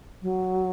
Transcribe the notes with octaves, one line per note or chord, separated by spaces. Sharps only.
F#3